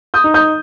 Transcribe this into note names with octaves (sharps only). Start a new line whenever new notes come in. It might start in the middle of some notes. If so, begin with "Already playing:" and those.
D#6 G6
D#4
D#6 G6